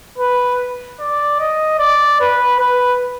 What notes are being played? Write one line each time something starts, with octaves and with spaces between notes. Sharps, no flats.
B4
D5
D#5
D5
B4
B4